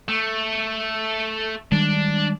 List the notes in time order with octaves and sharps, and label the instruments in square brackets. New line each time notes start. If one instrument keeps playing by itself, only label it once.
[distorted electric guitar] A3
[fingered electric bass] D#3 G3 G#3 [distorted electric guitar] D4